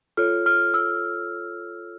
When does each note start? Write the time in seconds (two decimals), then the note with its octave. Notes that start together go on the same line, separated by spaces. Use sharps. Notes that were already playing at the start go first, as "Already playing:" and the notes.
0.17 F4 A4 C#5 F6
0.46 F6
0.74 E6